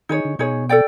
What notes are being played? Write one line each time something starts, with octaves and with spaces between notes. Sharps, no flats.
D#3 D#4 G#4 C#5
D3
B2 D#4 G#4 C#5
A4 D5 G5